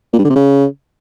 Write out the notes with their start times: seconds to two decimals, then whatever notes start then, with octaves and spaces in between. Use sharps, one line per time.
0.13 A#2
0.19 G2
0.24 D3
0.30 C3
0.36 C#3